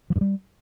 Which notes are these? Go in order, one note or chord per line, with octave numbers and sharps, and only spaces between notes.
F3
G2
G3